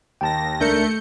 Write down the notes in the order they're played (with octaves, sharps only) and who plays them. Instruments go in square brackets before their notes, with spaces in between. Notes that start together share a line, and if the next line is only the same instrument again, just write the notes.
[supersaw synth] D#2 A#6 [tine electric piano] G5 A5
[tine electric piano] C#2 D4 A#4 [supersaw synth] A3 G6 C#7